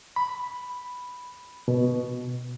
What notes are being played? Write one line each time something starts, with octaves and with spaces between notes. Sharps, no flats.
B5
B2